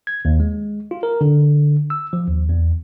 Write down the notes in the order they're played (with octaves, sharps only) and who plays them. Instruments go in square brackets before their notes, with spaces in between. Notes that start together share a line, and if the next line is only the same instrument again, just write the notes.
[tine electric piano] G#6
D#2
G#3
F4
A#4
D3
E6
F3
D#2
E2